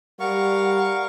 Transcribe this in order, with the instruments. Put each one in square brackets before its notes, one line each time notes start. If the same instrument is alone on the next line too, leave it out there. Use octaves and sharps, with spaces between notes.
[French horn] G3 [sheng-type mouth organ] A#4 F5 C#6 [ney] F#5